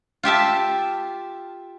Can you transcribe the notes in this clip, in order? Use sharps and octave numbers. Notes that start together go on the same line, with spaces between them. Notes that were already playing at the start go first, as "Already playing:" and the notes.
F4 G4 E5 A5